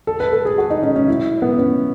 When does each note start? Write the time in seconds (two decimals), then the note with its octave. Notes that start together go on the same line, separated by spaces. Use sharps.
0.07 A4
0.20 B4
0.32 A4
0.45 G#4
0.58 F#4
0.70 D#4
0.83 C#4
0.96 C#4
1.08 E4
1.42 B3
1.58 C#4